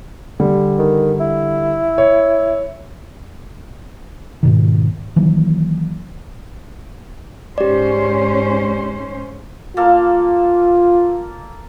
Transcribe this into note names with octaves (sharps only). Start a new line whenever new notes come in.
D3 G3
D#3
E4
C#5
G#2 B2 D#3
D#3 E3 F#3 A#3
G#2 C#4 G4 C5 D5
A#3 F4 A4 F5